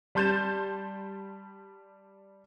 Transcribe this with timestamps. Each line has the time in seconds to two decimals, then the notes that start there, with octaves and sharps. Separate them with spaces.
0.15 G3 A5 C6 G6 A6 E7